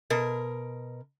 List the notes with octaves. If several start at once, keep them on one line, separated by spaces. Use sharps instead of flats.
B2 A#4